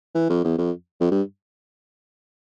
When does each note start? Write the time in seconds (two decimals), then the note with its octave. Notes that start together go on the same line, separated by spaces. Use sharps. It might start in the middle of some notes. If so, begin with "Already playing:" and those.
0.15 E3
0.29 F2
0.44 E2
0.58 F2
1.00 F2
1.11 G2